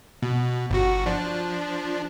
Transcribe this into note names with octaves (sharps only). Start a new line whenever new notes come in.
B2
G1 F#4
F3 D4